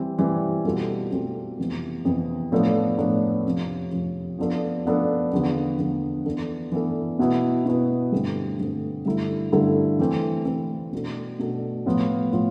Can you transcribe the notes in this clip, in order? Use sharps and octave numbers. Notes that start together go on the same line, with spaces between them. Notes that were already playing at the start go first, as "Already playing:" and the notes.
Already playing: E3 G3 C4
E3 G3 C4
B2 G3 C4 F4 A4
B2 G3 C4 F4 A4
F2 C3 E3 B3
F2 C3 E3 B3
A2 F3 B3 D4 A4
A2 F3 B3 D4 A4
F2 C3 F3
F2 C3 F3
F3 B3 D4 A4
F3 B3 D4 A4
E2 D3 F3 B3
E2 D3 F3 B3
E3 B3 D4 A4
E3 B3 D4 A4
B2 B3 E4 B4
B2 B3 E4 B4
G2 D3 A3 C4
G2 D3 A3 C4
G2 D3 A3 E4 A4
G2 D3 A3 E4 A4
E3 A3 C4
E3 A3 C4
B2 A3 D4 A4
B2 A3 D4 A4
A2 F3 B3 F4
A2 F3 B3 F4